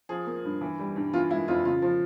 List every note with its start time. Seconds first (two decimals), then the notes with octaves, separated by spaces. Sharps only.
0.09 F3 G#4
0.26 A#3
0.44 G2
0.61 E3
0.79 G3
0.96 G2
1.13 E3 F4
1.31 G#3 E4
1.48 F2 F4
1.65 C#3 F4
1.82 F3